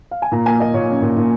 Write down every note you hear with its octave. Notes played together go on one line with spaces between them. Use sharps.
F5
G#5
A#2 A#5
A#3 G#5
A#3 D#5
A#2 C#5
C#4
A#2
A#2